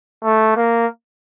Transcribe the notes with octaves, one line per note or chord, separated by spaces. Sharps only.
A3
A#3